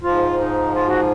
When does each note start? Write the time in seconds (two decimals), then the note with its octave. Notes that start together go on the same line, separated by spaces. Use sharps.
0.03 G#2 F3 F4
0.39 D#4
0.74 F4
0.87 F#4